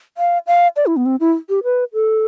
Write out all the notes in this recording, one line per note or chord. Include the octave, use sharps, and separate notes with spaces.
F5
F5
D5
E4
B3
C4
E4
G4
B4
A4